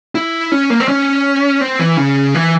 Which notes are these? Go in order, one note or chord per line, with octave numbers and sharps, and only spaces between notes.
E4
C#4
A#3
C4
C#4
C4
E3
C#3
E3